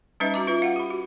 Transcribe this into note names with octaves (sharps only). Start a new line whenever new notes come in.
G3 C#4 D#4 B4 D#5 E5
F#4 A#5 D6
F4 B4 E5
F5 F#5
G4 B5
F#4